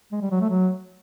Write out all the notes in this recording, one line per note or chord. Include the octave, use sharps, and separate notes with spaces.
G#3
G3
F#3
A3
F#3